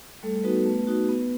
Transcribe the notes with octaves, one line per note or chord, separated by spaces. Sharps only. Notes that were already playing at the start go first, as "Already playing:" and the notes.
G3 A3 A4
B3 D#4 F#4 B4
A3
D#4 F#4
B3